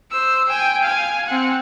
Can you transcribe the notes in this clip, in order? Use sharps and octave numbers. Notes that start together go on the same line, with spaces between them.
C5 E6
G5 G#5
F5 G#5
C4 F#5